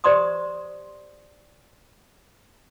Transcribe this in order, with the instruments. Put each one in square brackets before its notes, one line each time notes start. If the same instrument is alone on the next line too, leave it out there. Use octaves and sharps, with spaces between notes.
[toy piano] G4 C5 D5 A#5 C6 D#6